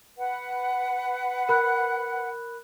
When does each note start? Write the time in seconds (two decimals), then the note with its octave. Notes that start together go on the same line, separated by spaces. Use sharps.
0.17 B4 F#5
1.49 A#4 B5 F#6